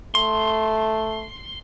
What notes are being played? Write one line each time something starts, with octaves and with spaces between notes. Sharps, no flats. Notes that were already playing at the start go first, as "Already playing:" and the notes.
A3 C6